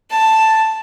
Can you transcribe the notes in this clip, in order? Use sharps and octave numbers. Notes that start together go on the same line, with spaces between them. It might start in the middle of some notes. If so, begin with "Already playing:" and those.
A5